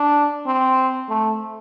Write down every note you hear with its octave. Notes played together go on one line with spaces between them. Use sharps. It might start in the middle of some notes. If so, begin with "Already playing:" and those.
Already playing: D4
C4
A3